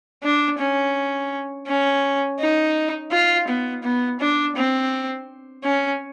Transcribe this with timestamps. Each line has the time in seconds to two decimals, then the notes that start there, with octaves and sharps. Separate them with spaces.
0.23 D4
0.59 C#4
1.67 C#4
2.40 D#4
3.12 F4
3.48 B3
3.83 B3
4.20 D4
4.56 C4
5.64 C#4